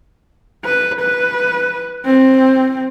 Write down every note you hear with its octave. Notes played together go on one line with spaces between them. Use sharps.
B4
B4
C4